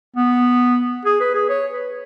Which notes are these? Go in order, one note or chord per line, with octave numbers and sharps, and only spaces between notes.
B3
G#4
B4
G#4
C#5
B4